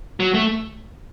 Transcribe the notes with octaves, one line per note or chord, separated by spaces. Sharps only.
F#3
A3